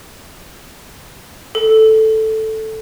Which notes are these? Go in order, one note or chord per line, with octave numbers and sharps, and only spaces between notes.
A4